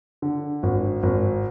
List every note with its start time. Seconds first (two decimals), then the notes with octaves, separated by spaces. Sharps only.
0.22 D3
0.63 G#1
1.03 G#1